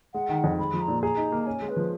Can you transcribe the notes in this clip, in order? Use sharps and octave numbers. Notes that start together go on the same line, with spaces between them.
G#3 F#5
D#3
F2
G#3 B5
F3
A#5
A#2
G#4 A#5
D#4
A#3
C#4 G#5
G#3
B4
F3